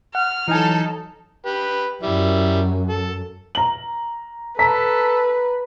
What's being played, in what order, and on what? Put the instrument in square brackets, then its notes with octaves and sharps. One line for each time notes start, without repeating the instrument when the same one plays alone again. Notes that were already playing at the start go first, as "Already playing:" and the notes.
[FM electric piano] F#5 [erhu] F6
[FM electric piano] E3 G#5 [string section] F#3 A4 [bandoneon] D#4
[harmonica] G4 B4
[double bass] F#2 [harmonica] G3 E4
[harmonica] A4
[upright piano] A#5 F#7
[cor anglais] A4 [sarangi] B4 [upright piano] A#5 B6